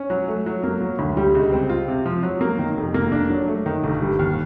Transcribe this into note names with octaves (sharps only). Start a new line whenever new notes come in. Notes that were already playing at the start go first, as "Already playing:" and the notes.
Already playing: C#4
F#3
A3
F#3
A#3
F#3
D2
G3
C#2
C4
F4
C3
F3
F#3
A#3
D#3
F1
A#3
D4
F#3
A3
D#3
G1
G3
D#2